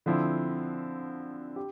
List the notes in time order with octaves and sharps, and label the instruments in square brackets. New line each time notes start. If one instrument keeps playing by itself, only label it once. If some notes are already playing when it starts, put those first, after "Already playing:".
[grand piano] D3 F3 C4 E4
G4